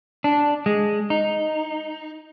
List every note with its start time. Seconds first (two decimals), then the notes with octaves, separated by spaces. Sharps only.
0.24 D4
0.66 G#3
1.10 D#4